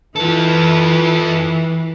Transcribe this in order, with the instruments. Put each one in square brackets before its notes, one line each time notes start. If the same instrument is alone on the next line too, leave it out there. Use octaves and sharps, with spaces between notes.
[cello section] E3 [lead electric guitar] F4 A4